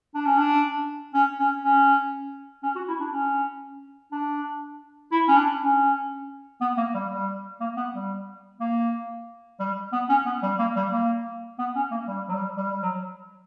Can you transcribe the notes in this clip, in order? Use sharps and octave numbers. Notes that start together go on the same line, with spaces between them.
D4
C#4
D4
C#4
C#4
C#4
C#4
F#4
E4
D4
C#4
D4
E4
C#4
D4
C#4
B3
A#3
G3
G3
A#3
B3
G3
A#3
G3
B3
C#4
B3
G3
A#3
G3
A#3
B3
C#4
A#3
G3
F#3
G3
G3
G3
F#3